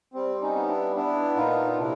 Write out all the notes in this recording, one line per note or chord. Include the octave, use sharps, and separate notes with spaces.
G3 C4
C#4 D#4
B3
D4 E4
B3 D4 E4
A#2 D#4 F4
C3 D4 E4